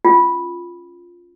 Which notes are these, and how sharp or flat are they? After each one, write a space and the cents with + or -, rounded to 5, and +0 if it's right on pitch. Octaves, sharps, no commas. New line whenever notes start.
C#4 +0 F4 +0